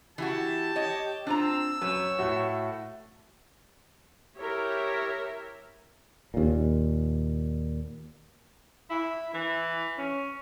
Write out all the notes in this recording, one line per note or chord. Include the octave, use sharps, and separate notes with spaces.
E3 E4 F#4 G4 A5
C#5 D#5
C4 D4 F4 A#5 E6
F#2 B4 C#5
A2 A3 F#4
E4 G4 A#4 C#5 E5
D#2 A#2
E4
E3
C#4